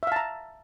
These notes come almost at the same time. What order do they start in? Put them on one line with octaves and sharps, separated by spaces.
E5 F5 A5 A#5